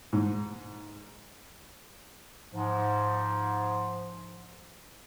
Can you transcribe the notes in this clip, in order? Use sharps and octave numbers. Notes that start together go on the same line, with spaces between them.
G#2
G#2 F3